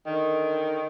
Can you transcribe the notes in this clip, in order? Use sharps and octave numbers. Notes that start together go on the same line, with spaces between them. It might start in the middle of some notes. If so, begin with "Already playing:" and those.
D3 D#3